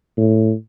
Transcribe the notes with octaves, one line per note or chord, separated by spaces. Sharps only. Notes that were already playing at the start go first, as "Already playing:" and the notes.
A2